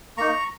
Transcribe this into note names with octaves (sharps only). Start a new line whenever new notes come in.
A#3 D#4 A#5 C#6